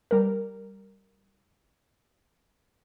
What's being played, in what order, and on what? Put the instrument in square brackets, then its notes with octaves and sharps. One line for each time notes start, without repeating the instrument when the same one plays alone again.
[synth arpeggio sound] G3 A#4